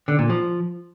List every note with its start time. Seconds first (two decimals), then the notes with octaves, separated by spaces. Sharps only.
0.08 D3
0.19 A#2
0.30 F3